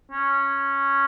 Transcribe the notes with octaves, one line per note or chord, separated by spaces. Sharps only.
C#4